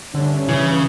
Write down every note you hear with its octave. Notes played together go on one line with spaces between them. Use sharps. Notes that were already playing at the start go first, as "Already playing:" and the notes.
G2 D3 A3 C#4
C#3 E3